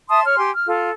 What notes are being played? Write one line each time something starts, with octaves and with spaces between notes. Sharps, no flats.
E5 A5 C6 D#6
C#5 F6
G4 G#5 C6
F6
F4 A4